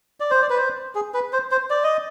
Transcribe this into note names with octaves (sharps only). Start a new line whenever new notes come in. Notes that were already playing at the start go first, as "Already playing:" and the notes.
D5
C5
D5
B4
C5
G#4
B4
C5
C5
D5
D#5